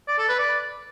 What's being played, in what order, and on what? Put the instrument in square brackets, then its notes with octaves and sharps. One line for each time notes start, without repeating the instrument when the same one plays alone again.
[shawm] D5
A4
B4
D5